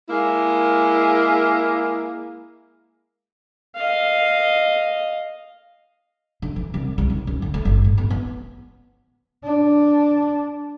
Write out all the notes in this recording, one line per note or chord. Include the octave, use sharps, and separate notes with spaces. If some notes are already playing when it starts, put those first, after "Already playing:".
G#3 A#3 E4
D#5 F5
D3
E3
C2
C2
D#3
F#2
D2
A3
G1
A2
B3
B3
D4